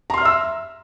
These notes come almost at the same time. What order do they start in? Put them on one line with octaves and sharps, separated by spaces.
A#5 C6 F6 E5 E6